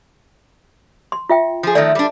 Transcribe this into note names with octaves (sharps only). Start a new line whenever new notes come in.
C6
F4 E5 G5
F3 G#4
D#3 F3 A3 D5 E5
G3 D4